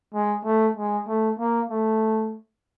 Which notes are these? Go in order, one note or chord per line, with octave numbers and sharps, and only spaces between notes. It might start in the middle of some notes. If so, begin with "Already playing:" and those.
G#3
A3
G#3
A3
A#3
A3